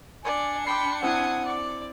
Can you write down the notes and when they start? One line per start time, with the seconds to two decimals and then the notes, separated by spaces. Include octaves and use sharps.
0.25 D4 D5 G#5 C#7
0.67 G5 B5 C6 D6 C7
1.03 C4 E4 F#5 G#5 D#6
1.45 D5 D6